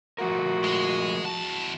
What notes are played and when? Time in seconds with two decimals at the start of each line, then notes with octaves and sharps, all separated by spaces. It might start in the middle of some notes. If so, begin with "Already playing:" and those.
0.18 F3 A3 F#4 A#4
0.64 G#3
1.24 E2 A5